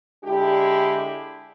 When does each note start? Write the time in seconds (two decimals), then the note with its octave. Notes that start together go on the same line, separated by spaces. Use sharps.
0.25 D3 G#3 D4 E4 G4